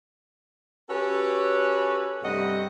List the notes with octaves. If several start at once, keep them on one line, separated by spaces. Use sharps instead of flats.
C#4 F#4 G4 A4 B4 C#5
G2 C3 G3 A3 D#5 F#5